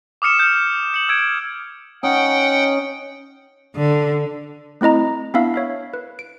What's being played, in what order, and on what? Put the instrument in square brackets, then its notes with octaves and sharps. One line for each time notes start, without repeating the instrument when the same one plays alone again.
[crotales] D6 D#6 F6 C#7 E7
F6 G6
C#7 F#7
E6 G#6 D7
[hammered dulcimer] C#4 D#4 [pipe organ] F#5 G5
[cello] D3
[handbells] A3 C4 E4 D#5 A#5
B3 D4 E4 E5 F5 E6
C#5 E5 F5
B4
D7